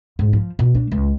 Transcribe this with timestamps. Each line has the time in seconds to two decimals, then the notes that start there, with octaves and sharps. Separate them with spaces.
0.19 G#2
0.33 F3
0.59 B2
0.75 D4
0.92 C#2